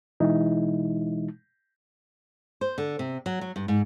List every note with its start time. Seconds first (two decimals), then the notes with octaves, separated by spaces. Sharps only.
0.20 B2 E3 G#3 D#4 E4
2.61 C5
2.78 D3
2.99 C3
3.26 F#3
3.41 F#3
3.56 G2
3.68 G#2